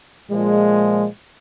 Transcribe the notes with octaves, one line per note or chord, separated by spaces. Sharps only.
A#2 F3 G#3